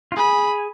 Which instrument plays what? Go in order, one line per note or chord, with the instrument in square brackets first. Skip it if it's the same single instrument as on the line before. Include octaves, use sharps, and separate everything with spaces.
[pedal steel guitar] F4
[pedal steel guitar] G#4 [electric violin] B5